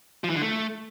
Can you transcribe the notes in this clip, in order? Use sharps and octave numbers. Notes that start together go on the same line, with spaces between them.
F3
E3
D3
A3